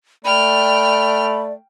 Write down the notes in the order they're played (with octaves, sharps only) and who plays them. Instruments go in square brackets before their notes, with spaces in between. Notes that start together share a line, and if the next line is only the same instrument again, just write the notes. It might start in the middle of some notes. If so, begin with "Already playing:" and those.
[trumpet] A3 [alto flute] D5 [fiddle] G5 F6 [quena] B5